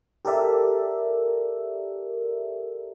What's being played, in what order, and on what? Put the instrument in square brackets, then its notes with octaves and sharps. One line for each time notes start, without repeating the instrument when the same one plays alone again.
[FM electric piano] G4 A4 A#4 D5 E5